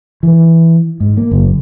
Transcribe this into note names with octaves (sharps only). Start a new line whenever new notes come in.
E3
G#2
A#3
F#1